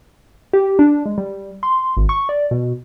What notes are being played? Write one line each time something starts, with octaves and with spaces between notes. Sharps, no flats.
G4
D4
G#3
G3
C6
G#1
C#6
D5
B2